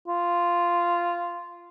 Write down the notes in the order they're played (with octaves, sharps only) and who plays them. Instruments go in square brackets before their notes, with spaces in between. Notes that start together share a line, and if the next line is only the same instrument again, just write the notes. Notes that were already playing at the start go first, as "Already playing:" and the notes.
[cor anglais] F4